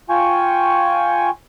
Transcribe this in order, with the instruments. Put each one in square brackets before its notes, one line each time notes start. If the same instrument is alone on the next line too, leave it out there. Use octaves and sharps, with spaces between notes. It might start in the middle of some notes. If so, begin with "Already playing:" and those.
[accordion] F4 G5 G#5 C#6